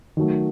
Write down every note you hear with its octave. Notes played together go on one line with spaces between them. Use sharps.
D#3 F#3 A3